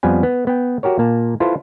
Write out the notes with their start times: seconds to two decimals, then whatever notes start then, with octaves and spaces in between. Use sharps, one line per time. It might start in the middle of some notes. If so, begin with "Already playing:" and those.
0.03 F2 F3 G3 B3 B4 G#5
0.23 B3
0.47 B3 G5
0.83 F#4 G4 A#4 C#5
0.98 A#2 A#3 A5
1.40 E4 F4 A4 B4 C5